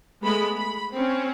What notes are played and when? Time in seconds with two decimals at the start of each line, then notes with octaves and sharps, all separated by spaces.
0.22 G#3 A3 B3 B5
0.56 B5
0.94 C4 C#4